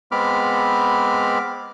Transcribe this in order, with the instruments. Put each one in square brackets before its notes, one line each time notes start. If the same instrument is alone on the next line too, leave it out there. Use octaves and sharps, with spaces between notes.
[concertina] G#3 B3 C4 B5 D6 F6